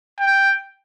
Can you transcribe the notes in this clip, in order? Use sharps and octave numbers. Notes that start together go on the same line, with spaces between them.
G5